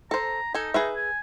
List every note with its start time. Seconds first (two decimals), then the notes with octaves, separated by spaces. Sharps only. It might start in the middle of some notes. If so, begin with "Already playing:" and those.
0.11 A4 C5 A#5
0.55 D#4 A4 G#5
0.74 G#4 B4 E5
0.96 G#5